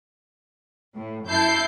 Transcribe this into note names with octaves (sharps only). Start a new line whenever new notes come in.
A2
F#2 E4 A5 G6 C7